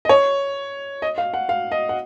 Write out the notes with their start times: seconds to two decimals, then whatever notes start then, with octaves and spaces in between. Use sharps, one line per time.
0.05 D#5
0.09 C#5
1.02 D#5
1.18 F5
1.34 F#5
1.49 F5
1.72 D#5
1.89 F#5